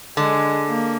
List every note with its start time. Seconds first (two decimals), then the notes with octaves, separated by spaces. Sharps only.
0.17 D3 G#3
0.68 A#3